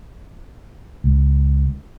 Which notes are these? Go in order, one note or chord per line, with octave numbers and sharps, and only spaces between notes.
C#2